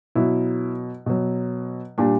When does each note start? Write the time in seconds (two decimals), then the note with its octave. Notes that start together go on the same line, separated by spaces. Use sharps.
0.15 B2 F#3 E4
1.06 B2 F#3
1.98 A#2 G3 D4